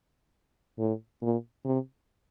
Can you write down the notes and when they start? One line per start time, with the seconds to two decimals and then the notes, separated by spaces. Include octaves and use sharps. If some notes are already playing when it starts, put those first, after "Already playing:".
0.79 A2
1.22 A#2
1.65 C3